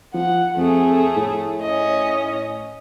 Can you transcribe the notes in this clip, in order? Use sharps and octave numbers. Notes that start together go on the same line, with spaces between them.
F3 F#5
F2 A3 G#4
A2
C#4 D#5